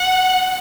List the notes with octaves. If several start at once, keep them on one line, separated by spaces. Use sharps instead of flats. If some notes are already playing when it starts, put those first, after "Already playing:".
Already playing: F#5